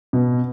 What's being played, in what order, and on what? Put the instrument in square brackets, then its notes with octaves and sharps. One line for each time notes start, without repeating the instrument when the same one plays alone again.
[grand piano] B2